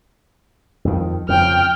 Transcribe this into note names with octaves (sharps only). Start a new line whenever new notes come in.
F2 D#3
F2 C#3 G5 F6